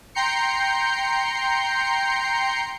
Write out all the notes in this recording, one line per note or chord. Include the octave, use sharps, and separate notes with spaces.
G5 A#5 C6 G6 C7 C#7